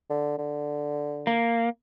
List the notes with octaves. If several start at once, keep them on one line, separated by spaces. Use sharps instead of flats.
D3
D3
A#3